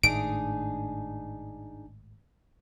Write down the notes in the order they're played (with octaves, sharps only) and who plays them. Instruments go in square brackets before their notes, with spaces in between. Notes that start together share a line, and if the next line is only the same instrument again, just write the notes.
[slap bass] G#1 A2 A3 [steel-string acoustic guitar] D4 D#4 G#4 [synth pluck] D7